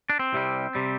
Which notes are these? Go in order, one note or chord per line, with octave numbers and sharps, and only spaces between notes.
D4
C4
C2 C3 G3
C3 G3